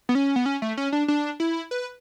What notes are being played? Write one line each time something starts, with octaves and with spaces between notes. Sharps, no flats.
B3
C#4
B3
C#4
A3
C#4
D4
D4
E4
B4